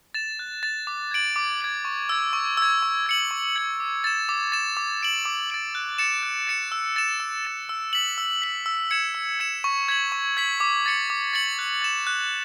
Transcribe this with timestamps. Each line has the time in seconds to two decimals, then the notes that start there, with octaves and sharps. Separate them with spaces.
0.14 A6 E7
0.39 F#6
0.63 A6 E7
0.87 D6
1.11 G#6 D7 F#7
1.36 D6
1.61 G#6 D7 F#7
1.85 C#6
2.09 E6 G#6
2.33 C#6
2.57 E6 G#6
2.82 C#6
3.06 G#6 C#7 F#7
3.31 C#6
3.56 G#6 C#7 F#7
3.80 D6
4.04 A6 E7
4.29 D6
4.52 A6 E7
4.77 D6
5.01 A6 D7 F#7
5.25 D6
5.50 A6 D7 F#7
5.75 F#6
5.98 A6 C#7 E7
6.23 F#6
6.47 A6 C#7 E7
6.72 E6
6.96 A6 E7
7.20 E6
7.45 A6 E7
7.69 E6
7.93 B6 F#7
8.18 E6
8.42 B6 F#7
8.66 E6
8.91 G#6 C#7 E7
9.15 E6
9.40 G#6 C#7 E7
9.64 C#6
9.89 G#6 B6 F#7
10.12 C#6
10.37 G#6 B6 F#7
10.60 D6
10.86 A6 C#7 F#7
11.10 D6
11.33 A6 C#7 F#7
11.59 F#6
11.82 A6 E7
12.07 F#6